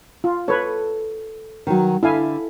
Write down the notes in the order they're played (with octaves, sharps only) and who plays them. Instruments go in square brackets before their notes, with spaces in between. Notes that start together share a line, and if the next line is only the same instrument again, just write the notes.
[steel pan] F4
[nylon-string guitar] A4 [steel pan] B4 C#5
[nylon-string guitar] D#3 F#3
[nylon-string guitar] D3 [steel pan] E4 F5 G#5